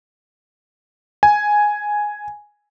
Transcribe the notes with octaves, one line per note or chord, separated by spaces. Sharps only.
G#5